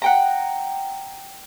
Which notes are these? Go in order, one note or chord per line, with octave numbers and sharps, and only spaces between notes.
F#5 G5 A#5